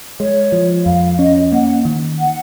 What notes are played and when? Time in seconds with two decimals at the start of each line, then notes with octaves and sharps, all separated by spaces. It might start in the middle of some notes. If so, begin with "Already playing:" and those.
0.20 G#3 C#5
0.52 F3
0.85 F2 F5
1.19 C#4 D#5
1.52 A#3 F#5
1.85 D#3
2.19 F#5